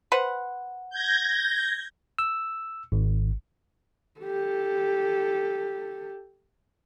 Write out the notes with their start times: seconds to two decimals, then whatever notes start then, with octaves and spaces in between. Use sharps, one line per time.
0.12 B4 C5 F#5
0.90 G6 G#6 A#6
2.19 E6
2.92 G#1
4.20 G4 A4